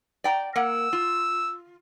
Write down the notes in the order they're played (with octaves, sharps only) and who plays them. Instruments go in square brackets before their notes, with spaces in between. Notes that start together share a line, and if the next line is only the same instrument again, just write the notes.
[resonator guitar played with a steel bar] D5 G5 A#5
[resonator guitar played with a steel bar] A#3 A#4 F#5 [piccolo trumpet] E6
[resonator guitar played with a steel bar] F4